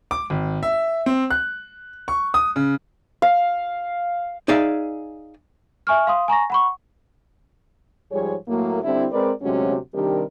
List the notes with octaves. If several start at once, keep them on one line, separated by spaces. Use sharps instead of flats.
D6
G#1
E5
C4
F#6
C#6
D#6
C#3
F5
D#4 G#4 D5 E5 F5
E5 G#5 C#6 F6
F5 C6 D#6
G#5 A#5 C#6 A#6
F#5 B5 C#6
G#2 F3 G3 G#4 C#5
A2 F#3 A3 A#3
D3 G3 C4 D4 E4
G#3 C4 A#4 B4 D5
D2 C3 F#3 G#3 C#4 F#4
C3 D#3 G3 D4 G4 A#4